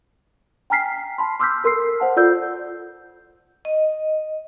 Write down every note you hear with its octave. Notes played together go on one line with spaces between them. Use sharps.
G5 G#5 A#5 F6 B6 C7
A5 B5 C6
C6 D6 E6 F6 G6 B6
A4 A#4 C6 E6 C7
C5 F#5 A5
F4 A4 D5 E6 G6
D#5